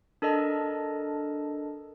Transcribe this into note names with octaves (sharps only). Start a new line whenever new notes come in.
D4 A4 A#4 D#5 A5